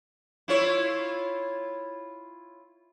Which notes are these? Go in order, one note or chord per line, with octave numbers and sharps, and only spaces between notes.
E4 F4 C#5